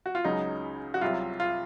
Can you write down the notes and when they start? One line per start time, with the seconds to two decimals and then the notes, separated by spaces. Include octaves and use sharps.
0.06 F#4
0.15 F4
0.24 C#2 C#3 F#3 D#4
0.94 F#4
1.01 C2 C3 F#3 F4
1.40 F4